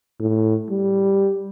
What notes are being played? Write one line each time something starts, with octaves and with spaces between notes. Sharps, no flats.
A2
G3